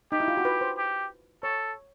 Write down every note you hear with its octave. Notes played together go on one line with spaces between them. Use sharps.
D#4 G4
E4
F4
F#4
B4
C5
G4
A4 C#5